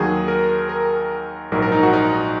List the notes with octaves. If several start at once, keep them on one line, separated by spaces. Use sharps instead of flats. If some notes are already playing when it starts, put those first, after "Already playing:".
Already playing: D#2 D#3 F#3 G#4
A#4
A#4
A#1 G#2 F#3 A#4
A#4
D#4
F#4
D#4